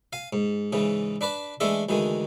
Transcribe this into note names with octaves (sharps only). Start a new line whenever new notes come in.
F5 G#5
G#2
G#2 C#3 E3
D4 B4 D5 A5
E3 G#3 A3 D4 A4
D2 D#3 E3 G#3